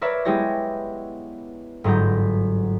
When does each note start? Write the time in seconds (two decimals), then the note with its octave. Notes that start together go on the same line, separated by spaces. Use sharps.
0.01 A#4 B4 C#5 D5 E5
0.25 G#3 B3 E4 G4 C#5 A#6
1.84 G1 G#2 F#3 A#5 G6